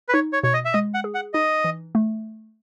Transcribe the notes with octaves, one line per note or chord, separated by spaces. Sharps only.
B4
D#4 C#5
C#5
B2 C#5
D#5
E5
G#3 D#5
F#5
G#4
F#5
D#4 D#5
E3
A3